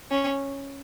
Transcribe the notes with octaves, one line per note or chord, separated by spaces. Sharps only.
C#4